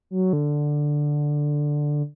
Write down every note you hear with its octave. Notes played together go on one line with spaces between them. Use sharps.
F#3
D3